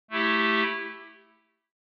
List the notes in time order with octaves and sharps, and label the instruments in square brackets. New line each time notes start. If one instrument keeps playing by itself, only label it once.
[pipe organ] A3 E4 G4